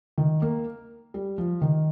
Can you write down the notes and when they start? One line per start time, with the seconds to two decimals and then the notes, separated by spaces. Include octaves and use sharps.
0.18 D#3
0.42 A#3
1.14 G3
1.38 F3
1.62 D#3